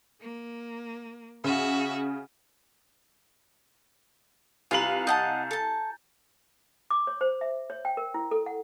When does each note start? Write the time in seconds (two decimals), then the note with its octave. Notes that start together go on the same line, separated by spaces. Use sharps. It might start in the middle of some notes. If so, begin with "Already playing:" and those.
0.21 A#3
1.44 C#3 F#4 E5
4.71 C2 F4 B4 F5 G#5 A#5 F#7
5.07 D#5 F#5 A5 G6 A6
5.51 A4 A5
6.91 D6
7.07 C#5
7.21 C5
7.41 E5
7.70 C#5
7.85 G5
7.97 A#4
8.14 E4
8.31 A4
8.46 F#5